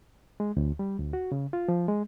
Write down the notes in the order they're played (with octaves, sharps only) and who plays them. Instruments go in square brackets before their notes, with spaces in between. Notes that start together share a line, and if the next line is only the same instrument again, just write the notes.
[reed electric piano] G#3
D2
G3
D2
F#4
C#3
F4
F3
G#3